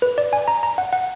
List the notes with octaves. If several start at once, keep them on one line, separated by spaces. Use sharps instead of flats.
B4
D5
G#5
A#5
A#5
F#5
F#5